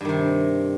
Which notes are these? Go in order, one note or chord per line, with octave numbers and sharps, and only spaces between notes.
G2 C3 D#3